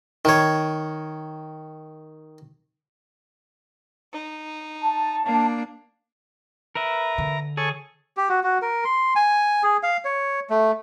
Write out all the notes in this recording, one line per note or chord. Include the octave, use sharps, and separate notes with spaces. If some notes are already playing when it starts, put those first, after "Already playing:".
D#3 C#5
D#4
A5
A#3 D4
A#4 B4 E5 A#5
D3
G#4 A4 C#5 G#5
G4
F#4
F#4
A#4
C6
G#5
G#4
F5
C#5
A3